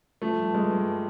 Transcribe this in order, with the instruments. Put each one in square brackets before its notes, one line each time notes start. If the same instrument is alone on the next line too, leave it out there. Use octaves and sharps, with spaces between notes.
[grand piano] F3 A3
G2
G2 G#3
G2